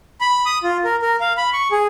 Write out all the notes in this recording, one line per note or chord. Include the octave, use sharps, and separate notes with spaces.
B5
D#6
F4
A#4
A#4
F5
B5
C#6
G#4